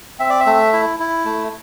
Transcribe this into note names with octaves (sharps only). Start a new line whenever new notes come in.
C4 E5
D5
E5
A3
E4
E4
A3